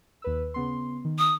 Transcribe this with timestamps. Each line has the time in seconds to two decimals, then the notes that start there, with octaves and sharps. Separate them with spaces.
0.22 D#2 B4 E6
0.54 C#3 B3 C6
1.05 D#3
1.19 D#6